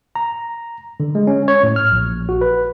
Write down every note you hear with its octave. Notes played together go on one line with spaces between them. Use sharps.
A#5
D3
G#3
C#4
C#5
A2
F6
A#1
F#4
B4